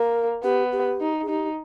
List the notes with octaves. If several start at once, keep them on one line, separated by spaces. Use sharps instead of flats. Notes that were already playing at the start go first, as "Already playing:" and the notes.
Already playing: A#3 A#4
B3 G4
G4
D#4
G#4
D#4 G4